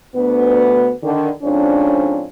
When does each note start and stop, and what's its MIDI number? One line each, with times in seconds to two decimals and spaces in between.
0.15 0.90 38
0.15 0.90 59
1.03 1.28 50
1.03 1.28 51
1.42 2.24 41
1.42 2.24 44
1.42 2.24 61
1.42 2.24 62